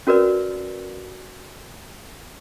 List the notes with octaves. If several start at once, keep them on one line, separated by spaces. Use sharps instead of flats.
C#4 F#4 A#4 B4 D5